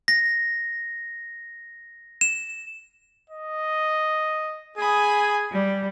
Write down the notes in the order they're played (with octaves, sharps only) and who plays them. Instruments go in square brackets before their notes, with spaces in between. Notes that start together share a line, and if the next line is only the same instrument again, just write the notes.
[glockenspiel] A#6
E7
[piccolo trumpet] D#5
[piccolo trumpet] G#4 [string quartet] G#5 B5 D#6
[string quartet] G3